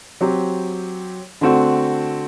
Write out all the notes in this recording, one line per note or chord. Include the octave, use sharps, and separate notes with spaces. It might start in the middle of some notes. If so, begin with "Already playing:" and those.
F#3 C4 G4
D3 A3 C4 F#4